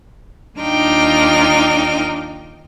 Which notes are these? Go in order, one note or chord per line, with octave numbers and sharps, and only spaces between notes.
D#2 D4 D#4 F4 G5 F6